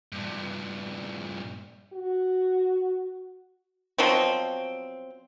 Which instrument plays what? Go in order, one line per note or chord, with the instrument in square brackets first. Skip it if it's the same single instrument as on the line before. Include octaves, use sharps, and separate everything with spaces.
[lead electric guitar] G2 A#2
[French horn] F#4
[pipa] B2 F3 F#3 C4